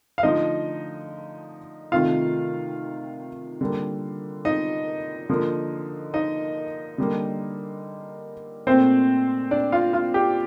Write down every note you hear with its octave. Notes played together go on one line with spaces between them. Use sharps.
F5
D3 F3 A3 D#4 D#5
C3 D#3 A3 F4 F5
D3 G3 A#3
D#4 D#5
D3 F3 A#3
D#4 D#5
D3 G3 A#3
A#2 A3 C4 C5
D4 D5
F4 F5
F4 F5
G4